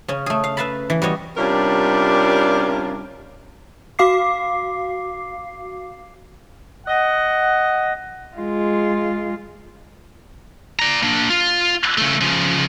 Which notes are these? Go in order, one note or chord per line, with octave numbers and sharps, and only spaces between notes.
C#3 C#4
A3 G#4
F5
B4 E5 F5 A5 B5
E3
G3 F#4 C#5 D#5
C3 G3 C#4 D4 F4 A#4
F#4 F5 D6 C7
D#5 F#5
G#3 F4
D5 A#5
A#3 D4
F4
C#3 A3
C#3 F3